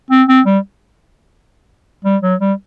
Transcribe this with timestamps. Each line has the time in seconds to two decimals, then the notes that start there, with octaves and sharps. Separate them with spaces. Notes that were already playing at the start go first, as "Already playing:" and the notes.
0.11 C4
0.29 C4
0.46 G3
2.05 G3
2.23 F#3
2.40 G3